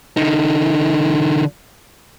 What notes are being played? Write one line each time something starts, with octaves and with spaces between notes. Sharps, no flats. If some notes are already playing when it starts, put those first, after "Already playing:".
D3 D#4